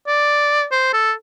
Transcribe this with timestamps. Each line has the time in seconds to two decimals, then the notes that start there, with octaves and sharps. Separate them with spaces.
0.07 D5
0.72 C5
0.93 A4